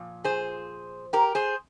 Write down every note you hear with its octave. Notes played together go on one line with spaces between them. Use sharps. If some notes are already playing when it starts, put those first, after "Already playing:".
Already playing: A#2 F3
G#4 C5
G4 A#4
G#4 C5